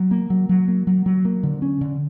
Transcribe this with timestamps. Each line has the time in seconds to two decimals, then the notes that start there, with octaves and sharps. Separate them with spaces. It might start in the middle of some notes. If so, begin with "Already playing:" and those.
Already playing: F#3
0.11 A#3
0.30 F#3
0.49 F#3
0.68 A#3
0.87 F#3
1.06 F#3
1.25 A#3
1.43 D3
1.62 C#4
1.81 D3